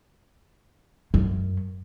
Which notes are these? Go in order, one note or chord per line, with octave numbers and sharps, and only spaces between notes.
F#2